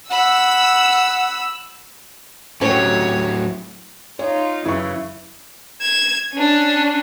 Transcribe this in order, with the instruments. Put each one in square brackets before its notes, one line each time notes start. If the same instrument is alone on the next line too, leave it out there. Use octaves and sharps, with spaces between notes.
[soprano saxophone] F#5 [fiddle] B5 [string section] E6
[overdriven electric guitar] A2 F#3 [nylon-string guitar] C#4 G4 [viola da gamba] C#5
[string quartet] D#4 F4 [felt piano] C#5
[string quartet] F#2 C#3 E3 [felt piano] E4 C#6
[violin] G#6 E7
C#4 D4